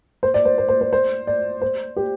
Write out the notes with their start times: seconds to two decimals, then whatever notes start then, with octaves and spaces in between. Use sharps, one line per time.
0.23 C5
0.34 D5
0.45 C5
0.58 C5
0.69 C5
0.81 C5
0.93 C5
1.27 D5
1.62 C5
1.96 G4